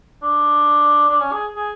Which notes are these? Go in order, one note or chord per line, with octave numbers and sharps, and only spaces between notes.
D4
D4
C#4
G#4
G#4